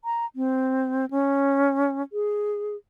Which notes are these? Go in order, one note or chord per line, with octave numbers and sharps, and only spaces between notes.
A#5
C4
C#4
G#4